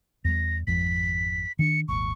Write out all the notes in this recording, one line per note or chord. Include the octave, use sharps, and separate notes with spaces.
E2 G3 A#6
G#1 F2 F3 B6
D#3 D4 C#7
D#1 G#1 C#6